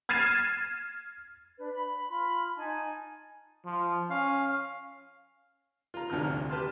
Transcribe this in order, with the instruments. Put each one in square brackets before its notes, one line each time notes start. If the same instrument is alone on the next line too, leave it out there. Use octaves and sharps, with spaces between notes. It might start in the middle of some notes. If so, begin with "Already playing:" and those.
[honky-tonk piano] F6 G#6 A6 C7 D#7 E7
[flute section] D4 B4
B5
F4 B5 C6
D#4 G#5 A5
[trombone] F3
[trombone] C#4 [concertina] F5
[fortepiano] F4 A#5
G#1 D2 C3 F3 A#5 F6
G4 B4 A5 C6 F6